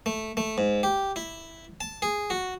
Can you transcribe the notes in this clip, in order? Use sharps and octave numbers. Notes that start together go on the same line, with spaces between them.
A3
A3
G#2
G4
E4
A5
G#4
F#4